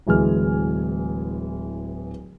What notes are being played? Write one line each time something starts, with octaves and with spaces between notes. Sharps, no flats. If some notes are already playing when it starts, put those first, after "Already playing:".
D1 E3 G#3 G#5 F6